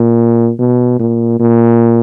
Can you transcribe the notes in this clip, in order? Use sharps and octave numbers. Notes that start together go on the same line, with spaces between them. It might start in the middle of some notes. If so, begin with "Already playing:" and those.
Already playing: A#2
B2
A#2
A#2